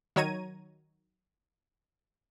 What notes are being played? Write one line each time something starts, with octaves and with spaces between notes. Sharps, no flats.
D#3 F#3 C#5 A#5 G#6 D#7